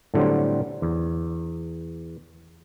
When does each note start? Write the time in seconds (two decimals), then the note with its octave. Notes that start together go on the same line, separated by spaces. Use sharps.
0.14 A2 D3 F#3 G3 C4
0.82 E2